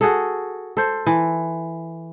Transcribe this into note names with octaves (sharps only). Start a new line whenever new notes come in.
F#4 G#4 A4
A4 C5
E3